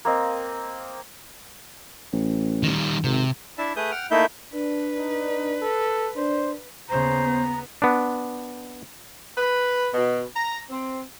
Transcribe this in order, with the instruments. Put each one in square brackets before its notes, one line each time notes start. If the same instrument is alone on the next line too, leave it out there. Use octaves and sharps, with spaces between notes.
[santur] A#3 C4 D#5
[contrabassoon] A1
[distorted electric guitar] D#3 G3
[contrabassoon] G#1 [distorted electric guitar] C3
[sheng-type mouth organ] D4 E4 E5 A5
A3 G#4 B4 D#6 G6
F#5 G5 F6
A3 A#3 D#4 E4 E5 G6
[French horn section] D4 [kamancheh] B4
[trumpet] D#4
A4
[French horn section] D4 [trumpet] C5
[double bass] D#2 C#3 [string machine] B3 [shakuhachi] C5 [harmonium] A#5
[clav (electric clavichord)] B3 D4
[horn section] B4
B2
A#5
C4